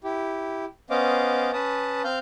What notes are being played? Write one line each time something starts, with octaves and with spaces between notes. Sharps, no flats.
E4 G4
B3 C#4 C5 D#5 F5 D6
C#4 B4 A5 D#6
C4 F5 F6 G6